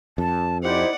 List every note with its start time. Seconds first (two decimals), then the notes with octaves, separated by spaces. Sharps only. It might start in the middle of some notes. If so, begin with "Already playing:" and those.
0.18 F2 A5
0.63 D#4 E4 G4 C5 D5 F#5